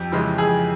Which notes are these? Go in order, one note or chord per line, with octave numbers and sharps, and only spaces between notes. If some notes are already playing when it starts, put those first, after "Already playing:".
Already playing: F2 G4
C#3 E3 G#3
F2 G#4